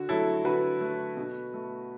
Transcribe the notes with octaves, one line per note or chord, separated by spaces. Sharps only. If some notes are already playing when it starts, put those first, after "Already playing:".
Already playing: D3 F#4
F#3 A3 E4 A4
D3 F#4 B4
F#3 A3
B2
A3